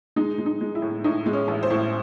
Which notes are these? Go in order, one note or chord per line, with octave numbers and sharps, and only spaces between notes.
G#3 D#4
G#3
D#4
G#3
E4
A2
A2 D#4
G#3
C#4
A1
C5
A2